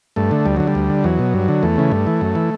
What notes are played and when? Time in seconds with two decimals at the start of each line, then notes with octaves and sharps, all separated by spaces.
0.16 G2 A3
0.31 D3
0.45 D2 G3
0.57 D3 F#3
0.67 G3
0.75 D2
0.90 D3
1.04 E2 F#3
1.19 B2
1.34 G2
1.48 D3
1.63 E2 A3
1.77 C#3 E3
1.92 G2
2.07 E3
2.21 F#2
2.35 E3